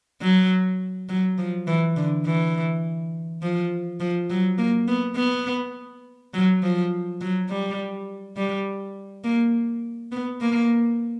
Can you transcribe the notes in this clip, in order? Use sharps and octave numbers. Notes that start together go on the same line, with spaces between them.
F#3
F#3
F3
E3
D3
E3
F3
F3
F#3
A#3
B3
B3
F#3
F3
F#3
G3
G3
A#3
B3
A#3